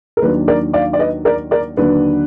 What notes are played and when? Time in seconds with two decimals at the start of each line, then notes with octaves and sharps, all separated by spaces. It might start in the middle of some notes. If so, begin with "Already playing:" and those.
0.17 A#4
0.22 D#2 D#3 F#3 D4 B4
0.48 A#4 D5
0.74 D5 F5
0.93 D5
0.99 B4 D#5
1.25 A#4 D5
1.51 A#4 D5
1.77 D#2 D3 F#3 D4 B4